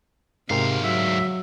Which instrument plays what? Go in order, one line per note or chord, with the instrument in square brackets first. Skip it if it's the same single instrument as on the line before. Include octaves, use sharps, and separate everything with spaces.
[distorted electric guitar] D2 F5 [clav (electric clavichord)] G#2 A#4 G5 [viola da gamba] C3
[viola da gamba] F#3 [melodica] E5